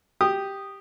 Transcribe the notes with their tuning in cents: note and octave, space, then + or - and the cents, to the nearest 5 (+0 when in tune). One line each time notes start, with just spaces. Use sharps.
G4 +0 D#6 -10